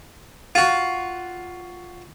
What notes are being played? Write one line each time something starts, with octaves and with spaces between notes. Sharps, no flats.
F4 F#4